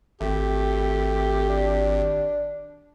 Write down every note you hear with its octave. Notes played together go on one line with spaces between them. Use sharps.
G#1 A3 G4
D4